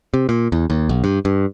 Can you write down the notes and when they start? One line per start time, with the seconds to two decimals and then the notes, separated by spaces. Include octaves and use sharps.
0.14 C3
0.29 A#2
0.52 E2
0.70 D#2
0.89 B1
1.04 G2
1.25 G2